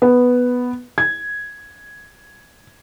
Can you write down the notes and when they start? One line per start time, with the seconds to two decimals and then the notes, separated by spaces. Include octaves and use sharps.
0.02 B3
0.98 G#6